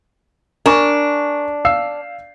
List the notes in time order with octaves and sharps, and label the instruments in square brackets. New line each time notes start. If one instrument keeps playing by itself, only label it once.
[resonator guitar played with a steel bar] D4 [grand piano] A#4 G#5 C#6
[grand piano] F5 E6 C7